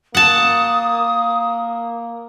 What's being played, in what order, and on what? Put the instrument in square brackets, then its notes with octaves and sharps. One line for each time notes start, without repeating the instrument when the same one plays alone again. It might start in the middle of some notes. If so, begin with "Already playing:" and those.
[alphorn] A#3 [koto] F#5 A5 [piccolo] D#6